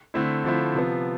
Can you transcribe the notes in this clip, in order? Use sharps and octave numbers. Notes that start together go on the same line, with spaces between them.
D3 A3 C4 E4
D3 F3 A3 C4 E4
C3 F3 B3